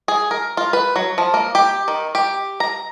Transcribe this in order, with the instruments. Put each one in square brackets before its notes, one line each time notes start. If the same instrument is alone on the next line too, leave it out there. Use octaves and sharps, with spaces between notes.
[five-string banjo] G#4
A#4
F4
B4
F#3
F3
A#3
G4
D#3
G4
A#5